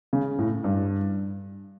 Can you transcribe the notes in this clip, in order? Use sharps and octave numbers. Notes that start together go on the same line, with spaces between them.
C#3
A2
G2